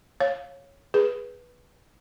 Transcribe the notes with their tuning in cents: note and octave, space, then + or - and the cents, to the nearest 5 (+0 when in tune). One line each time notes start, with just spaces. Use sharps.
C#5 +0 F5 +5
G#4 +0 B4 -10